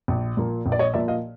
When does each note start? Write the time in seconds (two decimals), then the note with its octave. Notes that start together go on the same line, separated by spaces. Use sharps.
0.08 A#1
0.37 A#2 F3 A#3
0.66 A#1
0.72 D5
0.79 C#5 D#5
0.94 A#2 F3 A#3 D5 E5
1.08 D#5 F5